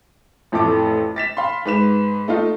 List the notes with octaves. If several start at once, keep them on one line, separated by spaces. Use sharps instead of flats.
A1 F2 E3 A3 A4 D6
A6 B6 E7
F5 B5 C6
G#2 B4 E7
A3 D#4 F4